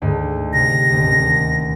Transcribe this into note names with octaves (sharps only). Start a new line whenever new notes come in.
D2 G#2
C3 A#6
D#1 D2